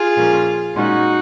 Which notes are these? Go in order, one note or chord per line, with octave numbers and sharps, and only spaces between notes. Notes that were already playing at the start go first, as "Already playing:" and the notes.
Already playing: F4 G#4
A#2 F3 A#3 C#4
A#2 G#3 C#4 D#4 F#4